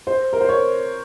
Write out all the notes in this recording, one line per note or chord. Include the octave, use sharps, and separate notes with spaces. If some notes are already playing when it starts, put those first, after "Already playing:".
C5
A#4
C5
C#5